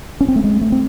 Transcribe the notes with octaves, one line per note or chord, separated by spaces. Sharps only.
C#4
C4
A3
G#3
A3
C4